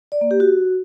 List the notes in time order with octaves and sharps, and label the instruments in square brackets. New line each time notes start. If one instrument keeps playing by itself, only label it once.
[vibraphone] D5
A#3
G4
F#4